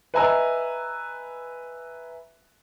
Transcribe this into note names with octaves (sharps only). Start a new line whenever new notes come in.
B4 D#5 E5 G#5 A#5 E6